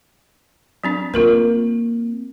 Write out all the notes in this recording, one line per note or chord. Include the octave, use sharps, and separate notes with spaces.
F#3 C4 D4
A#3 C4 F4 A#4 B4